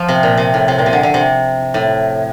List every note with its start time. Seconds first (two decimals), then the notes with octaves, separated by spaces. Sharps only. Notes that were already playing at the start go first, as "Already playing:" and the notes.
Already playing: F3
0.08 C3
0.23 A#2
0.37 C3
0.54 A2
0.68 C3
0.78 A#2
0.86 C3
0.93 D3
1.03 D3
1.14 C3
1.74 A2